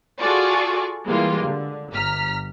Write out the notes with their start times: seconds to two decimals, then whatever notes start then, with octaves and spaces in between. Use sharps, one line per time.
0.19 F4 F#4 G#4 A4 D5 C#6
1.06 E3 G3 G#3 A#3 F4
1.44 D3
1.92 G1 A#5 F6 B6